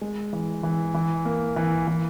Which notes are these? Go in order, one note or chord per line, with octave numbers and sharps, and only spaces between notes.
G#3
E3
E3
E3
A#3
E3
E3